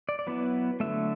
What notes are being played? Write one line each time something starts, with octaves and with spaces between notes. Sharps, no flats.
D5
D5
F#3 B3 E4 B4
D3 F#3 A3 E5